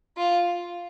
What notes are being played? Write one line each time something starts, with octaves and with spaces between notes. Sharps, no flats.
F4